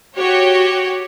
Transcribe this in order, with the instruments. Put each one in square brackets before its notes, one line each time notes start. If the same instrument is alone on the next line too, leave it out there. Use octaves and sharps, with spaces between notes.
[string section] F#4 G4 C#5